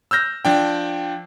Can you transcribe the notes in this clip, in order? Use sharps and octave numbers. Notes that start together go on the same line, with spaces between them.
E6 F6 G6 A#6
F3 D4 G5